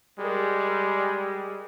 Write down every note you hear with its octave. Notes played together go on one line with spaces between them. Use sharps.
G3 G#3 G#4 A#4